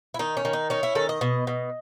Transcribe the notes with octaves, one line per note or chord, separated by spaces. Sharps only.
E4
D#3 D#4
C#4
D#3
D#4
C#4 D#4
E4
D#3 A4
D#5
B2
B2